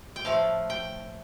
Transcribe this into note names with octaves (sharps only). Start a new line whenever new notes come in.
G5
A2 F3 A3 F5
G5